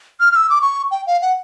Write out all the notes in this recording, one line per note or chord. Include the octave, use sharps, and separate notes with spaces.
F6
F6
E6
D6
C#6
G5
F5
F#5